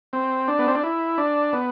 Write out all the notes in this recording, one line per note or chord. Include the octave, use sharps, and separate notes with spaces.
C4
D4
B3
C4
D4
E4
D4
B3